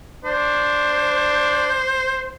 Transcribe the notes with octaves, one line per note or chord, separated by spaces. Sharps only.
D4 C5